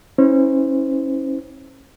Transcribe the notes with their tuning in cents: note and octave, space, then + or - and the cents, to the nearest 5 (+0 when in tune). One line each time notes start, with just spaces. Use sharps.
C#4 -30 E4 -45 C5 -25